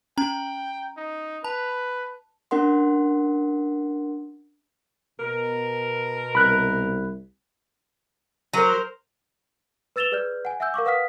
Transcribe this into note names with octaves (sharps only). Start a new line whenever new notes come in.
C#4 G5 A#5
D#4
B4 A5
C#4 D4 A#4 F#5 C6
B2 A#4
C2 B5 F#6
F#3 A#4 C5
B4 E6 A6 E7 F7 G7
G#4 B4 D5 F6 G6
F#5 G#5
E5 F#5 G#5 E6 G6
A#4 F5 C#6 D6
B4 F5 F#5 D#6 F6 B6